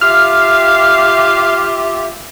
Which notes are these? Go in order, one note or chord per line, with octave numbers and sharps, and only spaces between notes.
F4 G4 E5 F5 F6